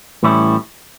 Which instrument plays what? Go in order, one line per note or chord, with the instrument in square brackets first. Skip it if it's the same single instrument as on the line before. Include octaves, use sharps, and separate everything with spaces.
[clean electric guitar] A2 E3 G3 C#4 E4